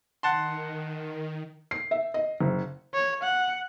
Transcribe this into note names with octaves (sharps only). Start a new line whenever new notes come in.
D#3 F#5 A5 C6
C7
E5
D#5
F#1
C#5
F#5